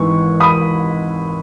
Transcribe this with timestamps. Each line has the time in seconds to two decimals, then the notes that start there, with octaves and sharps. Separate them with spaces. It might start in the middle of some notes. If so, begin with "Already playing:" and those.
Already playing: G#1 G#2 E3 C#6
0.40 B5 D#6